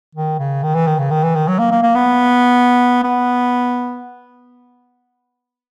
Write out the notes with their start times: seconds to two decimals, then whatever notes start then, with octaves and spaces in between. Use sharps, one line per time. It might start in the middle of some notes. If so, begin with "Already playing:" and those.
0.15 D#3
0.39 C#3
0.63 D#3
0.75 E3
0.87 D#3
0.99 C#3
1.11 D#3
1.23 E3
1.36 D#3
1.48 F#3
1.59 A#3
1.71 A#3
1.83 A#3
1.95 B3
3.04 B3